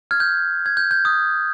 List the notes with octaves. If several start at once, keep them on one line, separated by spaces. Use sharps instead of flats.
F6 G#6
G6
G#6
G6
G6
D#6